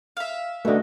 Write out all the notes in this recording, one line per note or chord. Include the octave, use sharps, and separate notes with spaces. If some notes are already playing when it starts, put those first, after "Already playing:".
E5 F5
D3 E3 A3 F#4 D#5